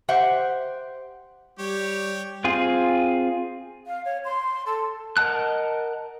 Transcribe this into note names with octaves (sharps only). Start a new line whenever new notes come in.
G4 C5 E5 F#5
G3 G4 C#5
C4 F4 G#4
F5
C#5
C6
A4
A#4 D#5 F#5 A5 F#6